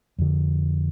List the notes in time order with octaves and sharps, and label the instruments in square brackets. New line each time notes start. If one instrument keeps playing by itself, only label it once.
[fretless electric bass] F2 D3